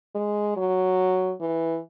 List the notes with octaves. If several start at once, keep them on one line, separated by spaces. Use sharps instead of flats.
G#3
F#3
E3